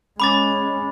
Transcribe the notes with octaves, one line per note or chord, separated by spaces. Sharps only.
G#3 C#4 B5 D6 A6